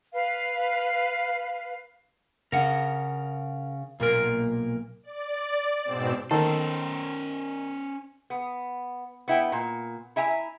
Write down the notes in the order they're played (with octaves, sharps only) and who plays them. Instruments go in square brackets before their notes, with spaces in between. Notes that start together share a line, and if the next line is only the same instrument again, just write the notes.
[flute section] B4 F5
[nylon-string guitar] C#3 [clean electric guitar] A#4 F#5
[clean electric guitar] B1 A#2 A#4 [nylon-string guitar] A#3
[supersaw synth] D5
G#2 B2 C4 E7
[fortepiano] D#3 [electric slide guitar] C#4 C5 [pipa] A4
[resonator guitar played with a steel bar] B3
B3 E4 G5
A#2
E4 E5 G#5 A#5